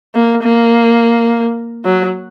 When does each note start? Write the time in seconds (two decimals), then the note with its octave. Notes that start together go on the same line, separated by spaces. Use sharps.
0.15 A#3
0.43 A#3
1.85 F#3